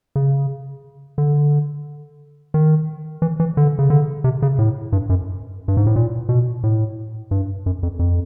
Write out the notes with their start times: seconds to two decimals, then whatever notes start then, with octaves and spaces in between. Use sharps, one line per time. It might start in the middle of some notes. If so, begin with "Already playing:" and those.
0.16 C#3
1.18 D3
2.54 D#3
3.22 E3
3.40 E3
3.57 D3
3.79 C#3
3.90 D3
4.24 C3
4.42 C#3
4.59 A2
4.92 G2
5.10 F#2
5.68 G2
5.77 G#2
5.86 A2
5.96 A#2
6.29 B2
6.64 A2
7.31 G2
7.66 F#2
7.83 F2
7.99 F2